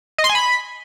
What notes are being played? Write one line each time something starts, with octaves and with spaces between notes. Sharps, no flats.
D#5
C6
G#5
B5